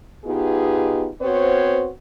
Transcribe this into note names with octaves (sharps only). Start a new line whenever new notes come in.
B2 B3 D#4 F4 G4 G#4
B3 C4 F#4 C5 C#5